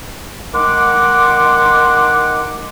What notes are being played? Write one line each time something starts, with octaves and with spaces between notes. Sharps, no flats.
D#3 G#3 D#4 F#5 C6 D6